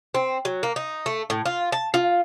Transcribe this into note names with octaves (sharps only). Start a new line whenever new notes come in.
C4
F#3
A#3
D#4
A3
A2
F4
A5
F4